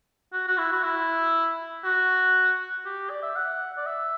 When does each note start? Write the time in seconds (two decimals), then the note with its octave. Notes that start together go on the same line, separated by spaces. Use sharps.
0.33 F#4
0.48 F#4
0.58 E4
0.72 F#4
0.83 E4
1.84 F#4
2.86 G4
3.10 D5
3.23 E5
3.36 F#5
3.77 D5
3.86 E5